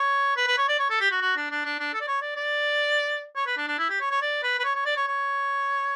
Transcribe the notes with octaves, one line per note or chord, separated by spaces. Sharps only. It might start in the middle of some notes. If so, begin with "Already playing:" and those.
Already playing: C#5
B4
B4
C#5
D5
C#5
A4
G4
F#4
F#4
D4
D4
D4
D4
A4
D5
C#5
D5
D5
C#5
B4
D4
D4
E4
G4
C#5
C#5
D5
B4
B4
C#5
C#5
D5
C#5
C#5